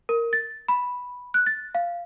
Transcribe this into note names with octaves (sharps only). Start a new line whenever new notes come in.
A#4
A6
B5
F#6
A6
F5